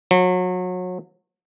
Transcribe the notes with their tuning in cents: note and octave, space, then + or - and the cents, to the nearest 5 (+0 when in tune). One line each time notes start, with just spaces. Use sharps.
F#3 -30